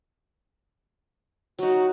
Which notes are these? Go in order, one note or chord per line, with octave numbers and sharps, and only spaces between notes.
F#3 D#4 F#4